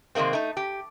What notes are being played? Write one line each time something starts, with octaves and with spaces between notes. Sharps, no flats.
C3 D#3 G#3 A#3 C4
A3 D#4
G4